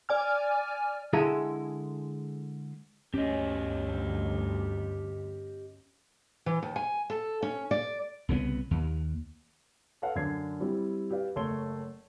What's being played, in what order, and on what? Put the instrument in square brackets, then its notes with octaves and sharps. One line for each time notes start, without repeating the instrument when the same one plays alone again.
[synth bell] D5 G#5 F6
[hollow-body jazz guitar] D3 G#3 E4 G#4 A4 A#5
[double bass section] G1 D2 [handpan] C#4 [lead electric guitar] G4 D#5
[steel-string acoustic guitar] E3
D#2
G#5
A4
C#4
D5
[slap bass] C2 C#3 E3 B3
D#2
[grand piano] A4 B4 C#5 F5 F#5
F#2 D3 D4 G#6 C7
G3 C4 E4
G4 B4 D5 F5
F#1 A3 C#5 C6 G7